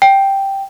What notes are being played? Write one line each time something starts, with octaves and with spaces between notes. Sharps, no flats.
G5